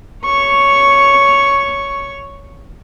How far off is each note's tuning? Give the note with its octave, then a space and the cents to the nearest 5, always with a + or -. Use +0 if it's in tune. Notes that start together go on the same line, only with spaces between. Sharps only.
C#5 +10 C#6 +0